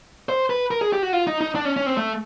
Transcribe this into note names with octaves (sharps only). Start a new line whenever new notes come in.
C5
B4
A#4
G#4
G4
F#4
F4
D#4
D#4
D4
C#4
C#4
C4
A3